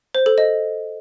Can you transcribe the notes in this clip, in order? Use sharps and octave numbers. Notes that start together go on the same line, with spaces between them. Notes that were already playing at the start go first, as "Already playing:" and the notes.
C5
A4
D#5